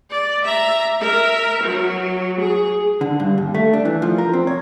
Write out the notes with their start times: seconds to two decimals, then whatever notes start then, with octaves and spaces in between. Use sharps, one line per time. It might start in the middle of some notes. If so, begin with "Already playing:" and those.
0.10 D5
0.44 E5 A#5
1.01 A#4 E5
1.64 F#3
2.41 G#4
3.01 D3
3.20 G2
3.38 D#2
3.55 A3
3.73 D4
3.85 E3
4.02 F3
4.18 A#4
4.33 C4
4.47 C#5